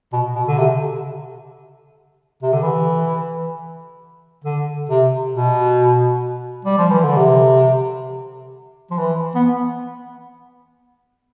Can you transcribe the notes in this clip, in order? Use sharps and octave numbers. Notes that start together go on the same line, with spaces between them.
B2
B2
D3
C3
C3
D3
E3
D3
C3
B2
G3
F3
E3
D3
C3
F3
E3
B3